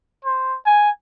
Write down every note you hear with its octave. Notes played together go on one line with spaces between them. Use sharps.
C5
G#5